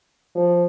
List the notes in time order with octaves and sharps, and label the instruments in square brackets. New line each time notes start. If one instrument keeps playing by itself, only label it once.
[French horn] F3